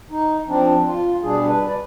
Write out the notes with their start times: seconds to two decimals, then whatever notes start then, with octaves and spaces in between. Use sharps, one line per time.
0.11 D#4
0.48 F3 C4 D4
0.86 F4
1.23 B2 G3 D4 G#4
1.48 B4
1.67 D5